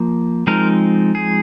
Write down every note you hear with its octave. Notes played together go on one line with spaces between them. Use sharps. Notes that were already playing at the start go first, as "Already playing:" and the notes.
Already playing: F3 A#3
F3 G#3 C4 D#4 A#4
G#4